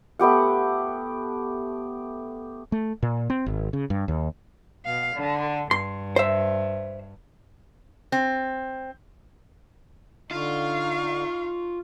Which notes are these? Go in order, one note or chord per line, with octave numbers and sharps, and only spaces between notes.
A3 B3 G4 F#5
A3
A#2
C4
G#1
C#3
G2
D#2
B2 F5
D3
G2 C6
C5 E5
C4
D3 D#4 F4 F5 C#6